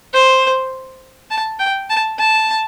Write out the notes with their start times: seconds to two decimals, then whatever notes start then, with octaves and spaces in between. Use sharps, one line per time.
0.13 C5
1.30 A5
1.60 G5
1.90 A5
2.19 A5